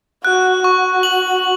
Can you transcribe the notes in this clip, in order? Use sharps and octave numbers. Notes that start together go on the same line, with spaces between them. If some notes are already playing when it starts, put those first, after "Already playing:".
F#4 F#6
F#4 C#6
F#7